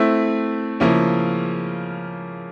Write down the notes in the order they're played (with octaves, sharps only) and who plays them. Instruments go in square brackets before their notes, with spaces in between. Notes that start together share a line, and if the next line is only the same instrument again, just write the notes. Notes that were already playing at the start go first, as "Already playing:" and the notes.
Already playing: [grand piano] A3 C4 E4
C#3 F3 A#3 C#4 E4